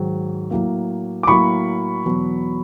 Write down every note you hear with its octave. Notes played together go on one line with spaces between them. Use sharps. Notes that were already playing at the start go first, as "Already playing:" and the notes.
Already playing: G#2 D#3 F#3
A2 F#3 A#3
D6
A2 F#3 A#3 B5 C#6
E2 B2 F#3